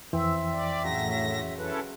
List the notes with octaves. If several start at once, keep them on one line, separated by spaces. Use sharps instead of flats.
F2 E3 C4 E5
D5
A2 C#3 F#3 A#6
C#4 E4 A4 B4